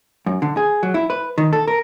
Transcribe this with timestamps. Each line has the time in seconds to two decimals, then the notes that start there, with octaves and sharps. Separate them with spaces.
0.26 F#2
0.42 D3
0.57 G#4
0.83 F#3
0.94 E4
1.10 B4
1.38 D#3
1.53 A4
1.68 A#4